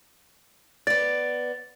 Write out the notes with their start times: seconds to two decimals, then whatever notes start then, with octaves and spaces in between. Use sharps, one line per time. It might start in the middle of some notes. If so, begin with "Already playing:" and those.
0.87 B3 D5 A6